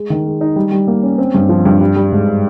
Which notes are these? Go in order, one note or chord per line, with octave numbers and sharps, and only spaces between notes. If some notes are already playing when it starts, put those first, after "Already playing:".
Already playing: G#3
D#3
G#3
D#4
G3
G3
A#3
C#4
C4
G2
F3
G2
G3
G3
G#2